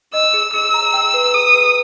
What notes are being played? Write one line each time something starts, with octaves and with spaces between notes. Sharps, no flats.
D#5 E6
G#4
G#4 E6
A#5
G5
B4
G#4 D#6
B4